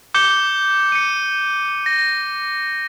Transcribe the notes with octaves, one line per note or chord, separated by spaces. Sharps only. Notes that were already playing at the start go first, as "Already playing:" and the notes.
D6 G6 C#7 G7
C#7 D#7
A#6